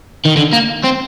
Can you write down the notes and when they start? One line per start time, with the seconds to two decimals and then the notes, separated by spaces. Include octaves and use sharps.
0.25 D#3
0.37 D3
0.53 A#3
0.84 C4